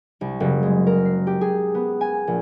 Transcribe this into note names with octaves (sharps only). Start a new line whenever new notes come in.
C2
F#1
G#3
A#4
C7
G4
G#4
B3
G#5
A#1